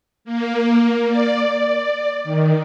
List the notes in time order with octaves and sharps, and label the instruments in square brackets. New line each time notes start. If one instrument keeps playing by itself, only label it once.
[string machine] A#3
D5
D#3